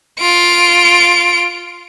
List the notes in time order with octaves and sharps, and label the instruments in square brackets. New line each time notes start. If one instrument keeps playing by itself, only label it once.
[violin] F4 D7